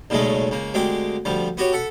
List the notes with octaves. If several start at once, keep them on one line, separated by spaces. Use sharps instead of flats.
B1 A#2 C#3 G#3 A3
C#2 A#3
D2 G#3 C4 G4 D6
D2 F3 G3
B3 F#4 G4 C#5
A4 F#5 B5